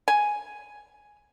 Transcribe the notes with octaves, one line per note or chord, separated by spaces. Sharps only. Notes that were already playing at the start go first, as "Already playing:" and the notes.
G#5